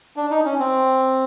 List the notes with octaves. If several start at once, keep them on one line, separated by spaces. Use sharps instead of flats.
D4
D#4
C#4
C4